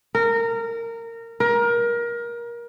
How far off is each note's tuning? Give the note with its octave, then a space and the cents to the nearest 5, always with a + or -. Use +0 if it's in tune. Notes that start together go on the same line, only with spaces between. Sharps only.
A#4 -20
A#4 +25